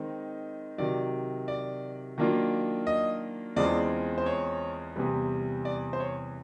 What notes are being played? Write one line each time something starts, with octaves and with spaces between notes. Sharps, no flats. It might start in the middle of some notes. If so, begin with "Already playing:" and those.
Already playing: D#3 G#3 C4 D#4
C3 D#3 F#3 D5
D5
D#3 F#3 A#3 D4 F4
D#5
E2 C#3 F3 G#3 C4 D5
C5
C#5
E2 C3 E3 G3
D5
C5
C#5